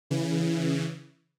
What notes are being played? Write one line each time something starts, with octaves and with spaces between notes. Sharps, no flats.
C#3 E3